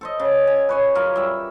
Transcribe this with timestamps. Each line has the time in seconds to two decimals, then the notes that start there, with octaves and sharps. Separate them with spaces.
0.01 A4 C5 D#5
0.20 C#3
0.47 G#5
0.69 B4 C#5 G#5
0.95 F#2 F4 A#4 F5
1.16 G3 E5